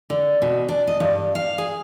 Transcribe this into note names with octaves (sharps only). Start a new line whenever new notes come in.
D3
B2
D4
D#5
G2
F5
G#4